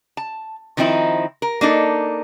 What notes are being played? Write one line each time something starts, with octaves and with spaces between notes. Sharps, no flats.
A5
D#3 F3 C4 D#4 E4
A#4
A#3 D4 D#4 A4